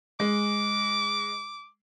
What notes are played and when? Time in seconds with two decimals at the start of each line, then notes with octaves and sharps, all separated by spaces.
0.20 G#3 D6